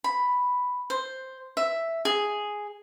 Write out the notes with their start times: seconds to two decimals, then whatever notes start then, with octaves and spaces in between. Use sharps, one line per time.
0.04 B5
0.90 C5
1.57 E5
2.05 G#4